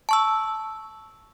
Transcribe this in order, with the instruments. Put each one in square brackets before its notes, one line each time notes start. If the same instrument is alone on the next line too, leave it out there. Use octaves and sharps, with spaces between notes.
[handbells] A5 C#6 E6